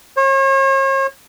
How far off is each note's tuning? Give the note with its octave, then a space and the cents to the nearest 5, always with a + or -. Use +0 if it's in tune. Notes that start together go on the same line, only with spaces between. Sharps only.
C#5 -40